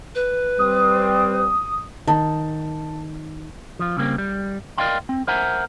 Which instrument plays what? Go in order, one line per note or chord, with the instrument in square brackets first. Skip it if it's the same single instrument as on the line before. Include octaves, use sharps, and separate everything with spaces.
[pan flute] B4
[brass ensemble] G3 C4 [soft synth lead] D#6
[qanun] D#3 [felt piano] A5
[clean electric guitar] F3 F4
C#3 G3 A#3 C4
G3
A#4 D5 D#5 F5 G5 C6
C4
A#4 C5 E5 F#5 G#5 A#5